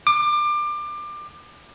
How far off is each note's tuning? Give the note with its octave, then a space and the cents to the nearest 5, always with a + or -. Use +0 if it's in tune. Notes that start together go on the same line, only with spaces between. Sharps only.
D6 +25